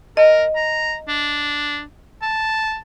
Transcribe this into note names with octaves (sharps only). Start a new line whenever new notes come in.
A#4 D#5
A#5
D4
A5